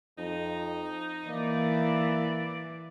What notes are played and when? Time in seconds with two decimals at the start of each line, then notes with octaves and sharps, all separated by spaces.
0.18 F2 D#4
1.28 E3 A#3 D5